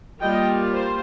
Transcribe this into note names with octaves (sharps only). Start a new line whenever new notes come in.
G3 A#3 F4 D#5 G5
C5